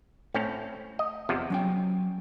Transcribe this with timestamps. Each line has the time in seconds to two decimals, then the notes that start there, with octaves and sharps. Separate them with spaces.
0.34 A2 A3 C4 C#4
0.99 D#5
1.29 E2 C3 F3
1.50 F#3 C#4 G5